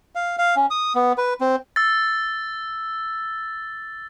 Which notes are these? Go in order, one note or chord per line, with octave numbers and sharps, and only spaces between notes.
F5
F5
C#4
D#6
B3
B4
C4
E6 A6